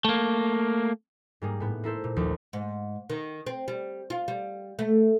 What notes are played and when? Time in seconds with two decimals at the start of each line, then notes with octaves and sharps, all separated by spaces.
0.05 A3 A#3
1.42 G#2 G3 A#3 G#4
1.60 A2 B3
1.84 A#3 E4 A4 C5
2.04 A#2
2.16 A#1 D#2 F3 D6
2.53 G#2
3.10 D#3
3.47 C4
3.68 G3
4.10 F4
4.28 G3
4.79 A3